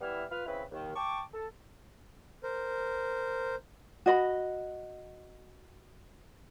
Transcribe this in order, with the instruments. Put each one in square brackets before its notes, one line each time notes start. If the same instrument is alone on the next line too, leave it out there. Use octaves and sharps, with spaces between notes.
[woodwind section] E3 G3 B3 E4 E5 F6
F4 B4 F6
C#3 C4 E4 B4
D#2 D#3
G5 A5 C#6 D6
A4
[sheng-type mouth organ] A#4 C5
[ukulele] F#4 D#5 B5